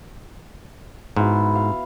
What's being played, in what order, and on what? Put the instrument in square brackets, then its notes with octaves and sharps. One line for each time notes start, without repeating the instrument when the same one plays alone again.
[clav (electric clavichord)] G#2 [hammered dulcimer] B3 E4 F#4
[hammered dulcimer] F5